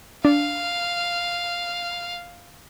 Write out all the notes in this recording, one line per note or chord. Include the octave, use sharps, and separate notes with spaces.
D4 F5